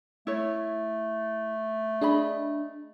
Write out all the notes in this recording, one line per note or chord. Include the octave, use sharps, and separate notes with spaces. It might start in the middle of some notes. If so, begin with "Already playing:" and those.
A3 E4 C#5
D4 G#4 D#5 B5